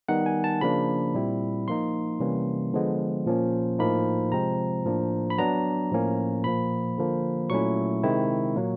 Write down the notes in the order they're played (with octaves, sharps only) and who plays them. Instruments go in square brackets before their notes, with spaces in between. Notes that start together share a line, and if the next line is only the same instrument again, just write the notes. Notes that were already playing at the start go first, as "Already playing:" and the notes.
[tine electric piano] D#3 G3 B3 D#4 F#5
G#5
A5
C#3 F3 A#3 D4 B5
A#2 G3 C4 E4
F3 A#3 D#4 C6
C3 E3 G3 A#3 C#4
D3 F3 G#3 B3
A#2 F3 A#3 C#4
A2 F3 A#3 D#4 B5
C3 F3 G#3 C4 A#5
A2 F3 A#3 D4
B5
F#3 B3 D4 A#5
A2 F3 A#3 C#4
A#2 F3 A#3 B5
D3 F3 A#3
A#2 F#3 A3 C#4 E4 C#6
C3 D#3 G#3 C4 E4
A#2 F#3 A#3